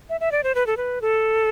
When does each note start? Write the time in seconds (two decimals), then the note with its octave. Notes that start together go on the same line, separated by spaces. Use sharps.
0.10 E5
0.21 E5
0.32 D5
0.44 C5
0.55 B4
0.67 A4
0.77 B4
1.02 A4